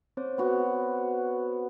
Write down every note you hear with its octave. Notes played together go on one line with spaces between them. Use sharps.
C4 C5 C#5
B3 F#4